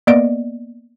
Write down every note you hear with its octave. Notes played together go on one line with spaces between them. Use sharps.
A#3 B3 D5 D#5 D7